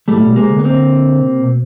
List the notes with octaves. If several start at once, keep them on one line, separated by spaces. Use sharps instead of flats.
A2 G3 A3
B2
C3 G#3 A#3
D3
B3
D3 A#3 C4
C3
B2